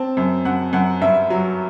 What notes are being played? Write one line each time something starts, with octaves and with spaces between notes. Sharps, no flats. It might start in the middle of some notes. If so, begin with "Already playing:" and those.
Already playing: C4 A5
F#2
F#2 F#5
F#2 F#5
G2 E5
F#3